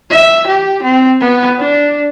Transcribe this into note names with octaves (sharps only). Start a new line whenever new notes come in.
E5
G4
C4
B3
D4